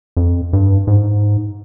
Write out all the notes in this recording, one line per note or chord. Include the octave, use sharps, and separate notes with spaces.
F2
G2
G#2